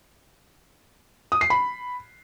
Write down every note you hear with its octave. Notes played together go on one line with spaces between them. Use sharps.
D#6
C7
B5